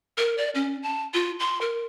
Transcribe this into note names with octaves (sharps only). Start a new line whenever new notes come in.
A#4
D5
C#4
A5
F4
C6
A#4